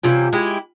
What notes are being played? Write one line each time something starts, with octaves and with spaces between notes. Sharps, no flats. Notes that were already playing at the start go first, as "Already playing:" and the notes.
C3 E3 G3 C#4 F4
G#3 E4 G4